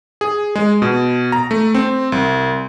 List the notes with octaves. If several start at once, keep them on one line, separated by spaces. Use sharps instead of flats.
G#4
G#3
B2
A#5
A3
C4
C2